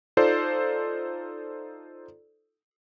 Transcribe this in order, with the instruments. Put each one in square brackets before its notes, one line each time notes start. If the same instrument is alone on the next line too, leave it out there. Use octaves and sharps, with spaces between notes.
[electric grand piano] D#4 F4 A4 C5 D5